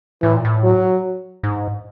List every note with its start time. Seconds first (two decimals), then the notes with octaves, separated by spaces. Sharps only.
0.22 A2 E3
0.34 A#2
0.45 A2
0.63 F#3
1.43 G#2